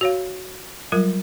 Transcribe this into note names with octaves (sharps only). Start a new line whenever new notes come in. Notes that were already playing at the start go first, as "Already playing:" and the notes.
F#4 C#5 F5
F#3 G3 F4 A#4